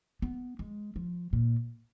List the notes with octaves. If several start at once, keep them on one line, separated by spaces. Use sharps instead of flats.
B3
G#3
F3
A#2